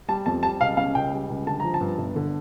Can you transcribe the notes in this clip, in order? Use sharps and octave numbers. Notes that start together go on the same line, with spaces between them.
G3 A5
F2 A5
G3 A5
C#2 F5
C#3 F5
C#2 G5
G3
C#2
D3 A5
F3 A#5
A5
G2
G1
D3